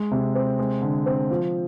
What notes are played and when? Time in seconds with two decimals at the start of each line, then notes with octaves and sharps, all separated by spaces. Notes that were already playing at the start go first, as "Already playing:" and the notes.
Already playing: G#3
0.11 C3
0.35 C4
0.59 G#3
0.82 D3
1.06 C4
1.30 F3